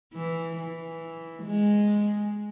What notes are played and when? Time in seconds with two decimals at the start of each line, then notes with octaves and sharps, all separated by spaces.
0.14 E3
0.58 E3
1.43 G#3